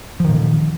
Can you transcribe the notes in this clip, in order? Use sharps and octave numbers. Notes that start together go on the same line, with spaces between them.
A#2 D#3 F3